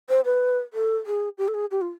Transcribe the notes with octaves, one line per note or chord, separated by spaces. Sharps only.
C5
B4
A4
G#4
G4
A4
G#4
G4
F4